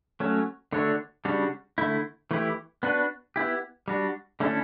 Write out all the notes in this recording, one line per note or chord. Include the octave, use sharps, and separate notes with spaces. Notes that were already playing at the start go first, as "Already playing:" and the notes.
F#3 A3 C#4
D3 A3 D4 F#4 C#5
C#3 G3 D4 F#4
D3 A3 E4
E3 A3 E4 G4
B3 D4 F#4 B4
B3 E4 G4
G3 D4 F#4
D3 A3 C#4 E4 A4